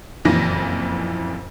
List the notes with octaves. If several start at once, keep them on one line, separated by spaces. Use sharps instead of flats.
F#1 F2 A#2 E3 A#6